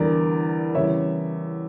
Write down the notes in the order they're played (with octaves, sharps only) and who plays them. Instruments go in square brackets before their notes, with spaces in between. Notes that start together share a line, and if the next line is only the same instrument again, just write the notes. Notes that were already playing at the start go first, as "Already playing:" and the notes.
Already playing: [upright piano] E2 D3 G3 A#4 D5
E2 C#3 G3 C#5 E5